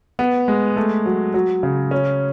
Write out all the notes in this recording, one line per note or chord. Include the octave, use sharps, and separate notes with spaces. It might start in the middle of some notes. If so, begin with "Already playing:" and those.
B3
G#3
A3
F#3
F#3
C#3
C#4